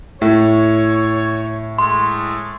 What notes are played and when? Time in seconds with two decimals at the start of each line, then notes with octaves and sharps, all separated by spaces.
0.22 A2 C#5
1.79 G#3 A3 C6